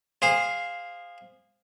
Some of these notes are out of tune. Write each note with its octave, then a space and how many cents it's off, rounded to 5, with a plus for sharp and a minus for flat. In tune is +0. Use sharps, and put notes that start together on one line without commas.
G#4 -25 C5 +0 F5 +5